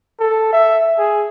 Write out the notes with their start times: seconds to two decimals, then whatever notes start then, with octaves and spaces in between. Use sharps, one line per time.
0.20 A4
0.53 E5
0.99 G#4